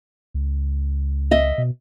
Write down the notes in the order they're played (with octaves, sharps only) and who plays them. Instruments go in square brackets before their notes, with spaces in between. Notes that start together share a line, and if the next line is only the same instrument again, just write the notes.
[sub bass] C#2
[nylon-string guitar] D#5 E5
[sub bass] B2